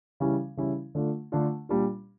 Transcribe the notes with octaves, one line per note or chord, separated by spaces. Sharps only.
C#3 E3 G3 C#4 E4
C#3 E3 G3 C#4 E4
D3 A3 D4 F4
D3 A3 D4 F4
A#2 G3 D4 F4